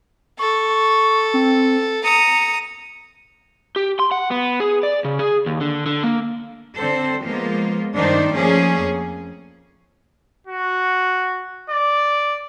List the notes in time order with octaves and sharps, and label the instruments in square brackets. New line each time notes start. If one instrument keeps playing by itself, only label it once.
[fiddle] A4 [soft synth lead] C#6
[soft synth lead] C4
[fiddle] A#5 D#6 [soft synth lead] C#7
[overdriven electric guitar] G4
C6
F#5
B3
G#4
D5
C#3
G#4
D#2
D3
D3
A#3
[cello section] D3 C4 A4 C5
F3 G#3 A#3 B3 F4
G2 D#3 D4 D#4 C5 D5
F3 A3 A#3 C#4 G#4
F2
[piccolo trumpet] F#4
D5